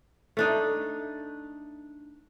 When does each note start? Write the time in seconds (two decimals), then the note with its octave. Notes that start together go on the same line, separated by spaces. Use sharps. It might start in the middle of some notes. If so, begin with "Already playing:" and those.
0.37 A3 D4 D#4